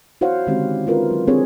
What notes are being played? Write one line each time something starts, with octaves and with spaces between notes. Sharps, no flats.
E4 F#4 C5 C#5 F5 F#5
D3 D#3 G#3 C4 C#4 G4
C#4 E4 F4 A#4 B4
F#3
C4 D4 G4 G#4 C#5